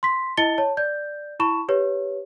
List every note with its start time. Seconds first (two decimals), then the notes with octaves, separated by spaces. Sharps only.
0.03 C6 B6
0.37 E4 D#5 A5 A6 C#7 G7
0.58 C#5 A5
0.77 D5 G6
1.40 E4 A5 B5 C#6 E7
1.69 G4 B4 C#5